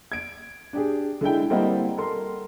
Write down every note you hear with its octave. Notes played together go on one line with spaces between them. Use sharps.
G#6 D7
D4 G4 G#4
D3 G#3 E4 G5
G3 A#3 C4 E4 D#5 F#5
A4 A#4 C6